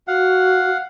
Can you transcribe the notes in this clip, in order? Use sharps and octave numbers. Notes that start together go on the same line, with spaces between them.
F#4 F5 F#5